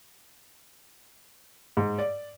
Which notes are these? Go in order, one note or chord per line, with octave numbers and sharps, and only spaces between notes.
G#2
D5